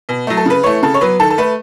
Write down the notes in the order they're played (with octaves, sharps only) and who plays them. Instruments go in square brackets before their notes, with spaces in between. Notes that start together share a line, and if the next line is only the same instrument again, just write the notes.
[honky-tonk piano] B2
F#3 A3
A4
C#3 B4
E3 A3 C#5
C#3 A4
C#5
F#3 B3 B4
D#3 A4
A4
A3 B4